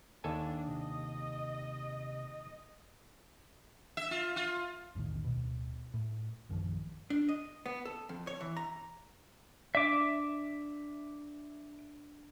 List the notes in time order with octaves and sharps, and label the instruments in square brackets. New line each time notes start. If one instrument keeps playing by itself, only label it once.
[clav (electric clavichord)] D#2 A4 G#5 [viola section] D4
[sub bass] C3 [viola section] D#5
[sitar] E5
F4
F4
[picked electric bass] B1 E2 A2 D#3
D1 B2
A2
A#1 F#2 D#3 F3
[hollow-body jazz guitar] D4
D#5
B3
A4
F2
C#5
E3
A#5
[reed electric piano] D4 D5 [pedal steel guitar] E5 D6